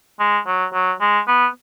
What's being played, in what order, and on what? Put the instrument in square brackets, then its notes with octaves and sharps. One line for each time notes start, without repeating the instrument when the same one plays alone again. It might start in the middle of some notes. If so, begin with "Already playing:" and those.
[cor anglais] G#3
F#3
F#3
G#3
B3